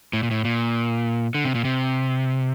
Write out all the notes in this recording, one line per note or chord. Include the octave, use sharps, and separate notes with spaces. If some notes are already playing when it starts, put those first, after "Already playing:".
A2
A#2
A2
A#2
D3
C3
A#2
C3